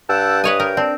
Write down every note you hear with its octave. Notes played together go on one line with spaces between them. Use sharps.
G2 F#5 G5 A5 E6
B4 C#5 D#5 G#5 D#6
A#4 G5
C4 D4